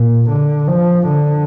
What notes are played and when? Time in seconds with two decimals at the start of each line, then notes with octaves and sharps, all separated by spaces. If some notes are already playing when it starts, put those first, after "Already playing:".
Already playing: A#2
0.30 D3
0.68 F3
1.07 D3